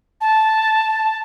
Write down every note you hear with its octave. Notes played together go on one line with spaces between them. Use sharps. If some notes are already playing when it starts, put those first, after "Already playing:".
A5